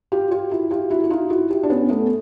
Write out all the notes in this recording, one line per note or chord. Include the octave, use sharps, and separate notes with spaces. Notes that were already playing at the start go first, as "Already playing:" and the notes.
F4 G4
F4 G4
E4 F#4
F4 G4
E4 F#4
F#4
D#4 F4
E4 F#4
F4 G4
D4
B3 C#4
A3 B3